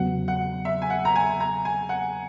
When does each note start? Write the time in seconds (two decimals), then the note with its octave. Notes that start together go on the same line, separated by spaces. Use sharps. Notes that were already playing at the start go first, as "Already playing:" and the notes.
Already playing: E2 C#3 F#3 B3 F#5
0.28 F#5
0.65 E5
0.82 G#5
0.90 F#5
1.05 A#5
1.16 G#5
1.40 A#5
1.65 G#5
1.89 F#5